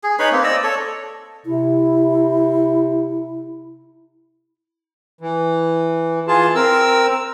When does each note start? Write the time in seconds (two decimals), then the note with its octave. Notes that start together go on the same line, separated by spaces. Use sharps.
0.03 G#4
0.19 D#4 B4 C#5 B5
0.32 A#3 C4
0.44 D5 D#5 E6
0.64 A4 C#5
1.46 C3 E4
5.21 E3
6.28 E3 F4 G#4 A5
6.55 C4 A#4 E6